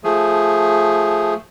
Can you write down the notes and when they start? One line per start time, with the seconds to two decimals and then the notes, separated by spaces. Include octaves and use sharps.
0.04 F3 A3 G#4